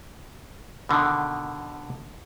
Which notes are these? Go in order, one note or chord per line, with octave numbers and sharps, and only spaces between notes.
B2 D3 D#3